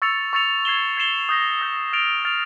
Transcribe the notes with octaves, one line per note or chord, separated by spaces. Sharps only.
C#6 E6 A6 C#7 F7
C#6 E6 A6 C#7 F7
G#6 C7 E7 G7
G#6 C7 E7 G7
D#6 G6 A#6
D#6 G6 A#6
F6 A6 D7 F7
F6 A6 D7 F7